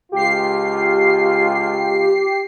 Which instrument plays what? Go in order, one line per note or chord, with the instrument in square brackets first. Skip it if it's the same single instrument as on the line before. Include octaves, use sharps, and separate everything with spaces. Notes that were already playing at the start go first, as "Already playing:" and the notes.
[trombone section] C#2 F4 [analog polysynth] G4 C7